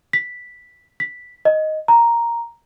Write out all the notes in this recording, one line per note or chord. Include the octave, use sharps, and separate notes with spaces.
B6
B6
D#5
A#5